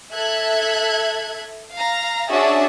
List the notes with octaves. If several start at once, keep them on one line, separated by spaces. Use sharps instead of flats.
A4 E5 F#6 G#6
F5 A#5
C#4 D4 F#4 G#4 E5 A5